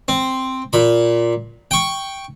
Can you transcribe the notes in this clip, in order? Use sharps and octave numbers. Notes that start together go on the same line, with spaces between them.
C4
A#2 B5
G5 C#6